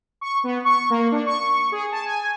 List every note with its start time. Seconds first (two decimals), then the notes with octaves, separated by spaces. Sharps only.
0.21 C#6
0.44 B3
0.65 C#6
0.90 A#3
1.12 D4
1.26 C#6
1.72 G#4
1.92 A5
2.05 G#5